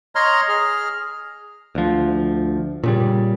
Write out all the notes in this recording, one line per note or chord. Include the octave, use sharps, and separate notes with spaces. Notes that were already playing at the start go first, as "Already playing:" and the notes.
C#5 D#5 A#5 C6 F6
G#4 F6
D2 F3
A#2 C#3 G3